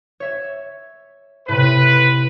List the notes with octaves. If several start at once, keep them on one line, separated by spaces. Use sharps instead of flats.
C#5 E5
A2 C3 B4